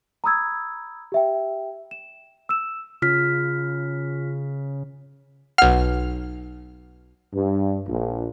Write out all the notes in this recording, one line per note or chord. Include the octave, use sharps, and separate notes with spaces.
A#5 B5 D#6 E6 G#6
G4 E5 G5
E7
E6 E7
C#3 F4 F6 B6
B1 F#5 F6
G2
A#1